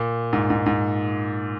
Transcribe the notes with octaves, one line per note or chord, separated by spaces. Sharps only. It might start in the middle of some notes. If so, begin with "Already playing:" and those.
Already playing: A#2
G#2
G#2
G#2